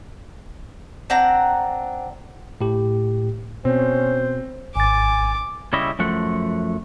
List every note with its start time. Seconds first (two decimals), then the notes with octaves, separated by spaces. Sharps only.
1.10 C4 D4 F#5 A#5
2.61 A2 G4
3.65 B2 C4 C#4 C5
4.76 G#1 G#5 D6 A6
5.73 C#3 G3 E4 C#5 D#5 E5
5.99 F#2 F3 A3 F#5